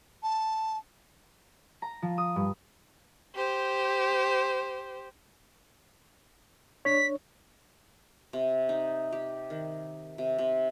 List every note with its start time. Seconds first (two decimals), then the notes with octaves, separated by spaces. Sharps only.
0.23 A5
1.82 A#5
2.02 F3
2.18 D#6
2.36 G2
3.35 G4 C5
6.85 D4 C#5 B6
8.33 C3
8.69 D#4
9.13 G4
9.50 D#3
10.18 C3
10.38 C3